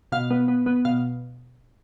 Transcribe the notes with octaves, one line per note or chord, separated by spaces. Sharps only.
B2 F5
B3
B3
B3
B2 F5